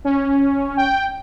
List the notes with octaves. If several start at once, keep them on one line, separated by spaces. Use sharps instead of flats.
C#4
G5